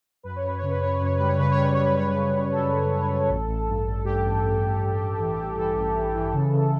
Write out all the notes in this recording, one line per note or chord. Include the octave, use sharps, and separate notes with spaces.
F#2 B4
C#5
F#2 B4
C#3 C#5
B4
F#2 C#5
B4
F#2 C#5
G3 B4
C#5
C#3 B4
C#5
G3
B4
G3 C#5
B4
G3 C#5
B4
C#3
C#3
F#2 A4
G3
C#3
F#2
A1
A1
G2
A1
G2 G4
A1
A1
A1
G2
G2
E3
A1
E3 A4
A1
E3
E3
C#3
C#3